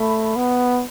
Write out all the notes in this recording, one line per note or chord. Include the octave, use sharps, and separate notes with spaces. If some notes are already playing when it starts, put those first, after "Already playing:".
Already playing: A3 B5
B3